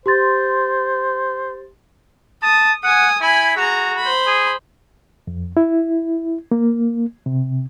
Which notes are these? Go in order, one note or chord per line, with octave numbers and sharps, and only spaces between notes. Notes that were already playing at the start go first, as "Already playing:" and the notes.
G4 C5 C6 A6
A5 D#6
F#5 G#5 D#6
E4 G#5 B5
F#4 G#4 A#5
C5 B5
G#4
F2
E4
A#3
C3